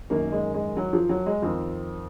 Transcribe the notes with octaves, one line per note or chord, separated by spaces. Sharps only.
F#2 D#3 A#3
G#3
G#3
F#3
F3
F#3
G#3
F2 D#3 C4